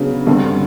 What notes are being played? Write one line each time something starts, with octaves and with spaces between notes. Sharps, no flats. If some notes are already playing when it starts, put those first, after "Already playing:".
Already playing: C#3 F#3 B3 D4
G2 D3 G3 C4